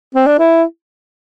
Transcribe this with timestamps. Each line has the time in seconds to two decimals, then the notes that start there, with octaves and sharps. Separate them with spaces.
0.15 C4
0.26 D4
0.39 E4